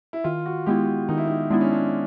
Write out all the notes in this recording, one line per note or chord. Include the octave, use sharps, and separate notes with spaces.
E4
D#3 F4
F#4
G#3 B3 E4 G4
D#3 D#4
E4
D#4
G#3 B3 D4 E4
C#4
D4